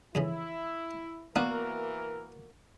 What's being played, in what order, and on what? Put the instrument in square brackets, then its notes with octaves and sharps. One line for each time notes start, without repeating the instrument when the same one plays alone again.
[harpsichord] F2 C#3 E3 [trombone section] E4
[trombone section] E3 A#4 [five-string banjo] A#3 F#4 D5 [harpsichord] B3